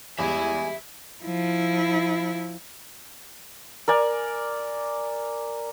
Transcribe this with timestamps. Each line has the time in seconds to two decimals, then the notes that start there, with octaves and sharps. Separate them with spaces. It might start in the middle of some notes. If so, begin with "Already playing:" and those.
0.19 E2 G2 E3 G#3 E5 G#5 B5
1.24 F3 E4
3.88 A#4 D5 G#5